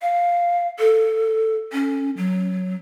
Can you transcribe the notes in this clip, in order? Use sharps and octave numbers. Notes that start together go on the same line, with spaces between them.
F5
A4
C#4
F#3